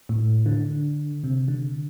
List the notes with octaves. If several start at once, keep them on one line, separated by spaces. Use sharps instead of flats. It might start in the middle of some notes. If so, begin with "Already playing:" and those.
A2
D3
C3
D3